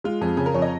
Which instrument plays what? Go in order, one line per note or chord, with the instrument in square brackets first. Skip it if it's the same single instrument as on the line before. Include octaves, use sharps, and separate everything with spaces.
[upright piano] G#3 [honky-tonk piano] F4
[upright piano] F2 [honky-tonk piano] G#4
[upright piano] C#3 [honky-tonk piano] G#4
[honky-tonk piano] A#4
[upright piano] F2 [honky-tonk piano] C#5
[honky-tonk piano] D#5